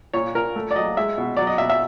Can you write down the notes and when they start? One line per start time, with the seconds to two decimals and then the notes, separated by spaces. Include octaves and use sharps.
0.13 A#2 C#5
0.35 A#2 A#4
0.56 A3
0.71 D5
0.75 F#3 D#5
0.97 G#3 E5
1.18 B2
1.37 F#3 D5
1.47 D#5
1.58 B2 E5
1.70 E5